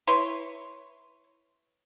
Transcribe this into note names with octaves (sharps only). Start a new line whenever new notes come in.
E4 B4 C#5 C6